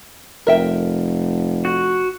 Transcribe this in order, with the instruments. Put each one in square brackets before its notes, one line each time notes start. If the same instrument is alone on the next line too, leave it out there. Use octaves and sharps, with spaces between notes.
[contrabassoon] F1 [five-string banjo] A#4 E5 G5
[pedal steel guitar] F#4